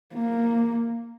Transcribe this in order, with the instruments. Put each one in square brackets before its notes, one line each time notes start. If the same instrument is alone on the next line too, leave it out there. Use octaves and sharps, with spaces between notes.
[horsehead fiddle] A#3